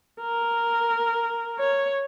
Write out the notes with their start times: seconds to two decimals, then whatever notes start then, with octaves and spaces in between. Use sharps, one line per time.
0.21 A#4
1.59 C#5